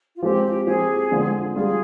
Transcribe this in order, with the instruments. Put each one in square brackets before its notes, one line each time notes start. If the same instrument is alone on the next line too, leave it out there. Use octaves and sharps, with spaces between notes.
[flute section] F4
[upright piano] F3 G#3 C4 [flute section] G4
[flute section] G4
[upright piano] F3 C4 G4 [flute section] G#4
[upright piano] D3 F3 G#3 C4
[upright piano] G3 D4 F4 [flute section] G#4